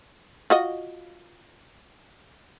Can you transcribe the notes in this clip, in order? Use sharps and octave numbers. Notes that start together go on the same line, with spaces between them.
F4 F#4 D#5